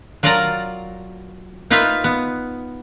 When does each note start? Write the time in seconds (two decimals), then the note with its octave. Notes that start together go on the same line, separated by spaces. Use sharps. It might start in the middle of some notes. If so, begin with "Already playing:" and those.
0.23 F#3 F4 A#4 D5 A5 A#5
1.70 A#3 D#4 F4 B4 E5 F5
2.04 B3